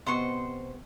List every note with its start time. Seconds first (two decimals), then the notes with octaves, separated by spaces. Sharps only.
0.07 C3 B3 C5 D#5 C6 C#6